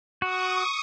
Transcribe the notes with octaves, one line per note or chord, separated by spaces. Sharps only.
F#4 C#6 D#6